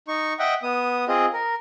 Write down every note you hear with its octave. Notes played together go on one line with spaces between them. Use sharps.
D#4 C#6
D#5 E5 F#5 G5
B3 D#6
C4 F4 G#4 D#5
A#4